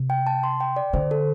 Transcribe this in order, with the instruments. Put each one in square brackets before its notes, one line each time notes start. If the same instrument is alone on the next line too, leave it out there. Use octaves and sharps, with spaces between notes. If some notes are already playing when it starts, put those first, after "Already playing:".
Already playing: [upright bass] C3
[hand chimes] G5
A5
C6
G5
D5
[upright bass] D3 [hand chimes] C5
[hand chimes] A4